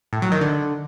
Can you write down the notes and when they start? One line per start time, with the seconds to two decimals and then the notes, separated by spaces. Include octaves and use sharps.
0.13 A2
0.22 F#3
0.32 D#3
0.41 D3